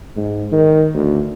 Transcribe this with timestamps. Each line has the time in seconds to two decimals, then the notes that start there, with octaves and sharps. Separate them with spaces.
0.16 G#2
0.52 D#3
0.94 D2